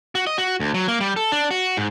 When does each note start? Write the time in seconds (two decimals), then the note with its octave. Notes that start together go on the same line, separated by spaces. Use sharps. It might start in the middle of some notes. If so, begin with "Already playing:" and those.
0.15 F#4
0.27 D#5
0.38 F#4
0.60 D2
0.74 F#3
0.88 A#3
1.01 G3
1.16 A4
1.32 D4
1.51 F#4
1.77 G#2